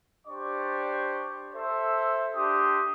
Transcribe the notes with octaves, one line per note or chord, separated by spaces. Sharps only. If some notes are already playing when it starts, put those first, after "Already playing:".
D4 G4 C5 D5 C#6
A4 C5 E5
D4 G4 C6 D#6